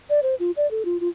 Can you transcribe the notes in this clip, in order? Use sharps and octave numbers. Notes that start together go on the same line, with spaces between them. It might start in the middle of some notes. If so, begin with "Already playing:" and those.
D5
C5
F4
D5
A4
F4
F4